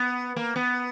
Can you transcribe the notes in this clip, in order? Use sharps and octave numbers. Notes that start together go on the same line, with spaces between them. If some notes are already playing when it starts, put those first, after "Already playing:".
Already playing: B3
A#3
B3